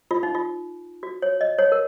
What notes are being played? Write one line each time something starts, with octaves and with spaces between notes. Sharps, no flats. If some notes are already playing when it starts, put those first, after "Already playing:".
F4
D#4
F4
F#4
C#5
D#5
C#5
A#4